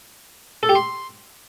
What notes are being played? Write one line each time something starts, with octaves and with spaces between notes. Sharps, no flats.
A4
G4
C6